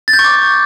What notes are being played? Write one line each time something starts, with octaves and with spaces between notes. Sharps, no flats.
A6
G6
C#6
D6